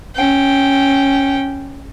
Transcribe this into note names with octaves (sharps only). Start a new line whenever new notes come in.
C#4 G5